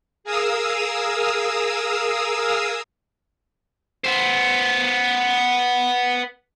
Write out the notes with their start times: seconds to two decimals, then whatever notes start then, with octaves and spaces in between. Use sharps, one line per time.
0.24 G#4 A#4 F5 D#6 E6
4.04 B3 C5